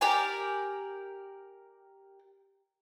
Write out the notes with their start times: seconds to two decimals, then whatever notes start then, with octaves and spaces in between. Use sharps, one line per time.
0.01 G4 A#4 D5 G#5